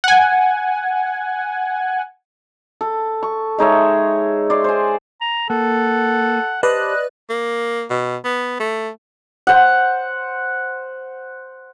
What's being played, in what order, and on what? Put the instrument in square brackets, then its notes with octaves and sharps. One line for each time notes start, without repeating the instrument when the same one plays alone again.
[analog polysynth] F#5 G#5
[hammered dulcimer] A4
C#6
G#3 D#4 C#5 E5
D5 C6
C5 G#5
[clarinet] A#5
[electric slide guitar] A#3 [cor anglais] A4 [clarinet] F#5
[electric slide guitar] G4 C5 A5 [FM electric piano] B4 D5 F#6 [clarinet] D#5
[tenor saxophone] A#3
B2
B3
A3
[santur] C5 F#5